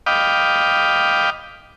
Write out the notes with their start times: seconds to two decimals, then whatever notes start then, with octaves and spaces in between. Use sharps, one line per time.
0.06 D#5 F5 G5 B5 D6